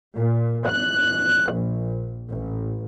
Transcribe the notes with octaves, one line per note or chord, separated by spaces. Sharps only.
A#2
F#6
A#1
A1